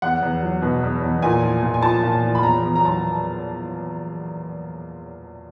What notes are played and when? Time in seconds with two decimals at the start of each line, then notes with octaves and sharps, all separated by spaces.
0.02 E2 F#5
0.22 E2
0.43 F#3
0.62 B2
0.83 E2
1.02 E2
1.22 A#2 G#5
1.42 F3
1.62 A#2
1.74 G#5
1.82 F3 A5
2.03 A#2
2.23 F3
2.35 B5
2.43 E2 A#5
2.63 E2
2.75 A#5
2.83 F#3 A5